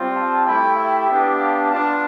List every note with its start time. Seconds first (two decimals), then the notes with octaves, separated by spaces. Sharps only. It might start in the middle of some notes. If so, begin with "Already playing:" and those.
Already playing: G3 C4 F4
0.14 F5 A5
0.46 A3 E4 G4 G5 B5
0.76 E5 G5
1.08 B3 D4 G4
1.38 F5 A5
1.70 B3 D4 F4 F5 A5